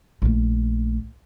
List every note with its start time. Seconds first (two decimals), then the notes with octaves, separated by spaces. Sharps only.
0.22 A#1 A3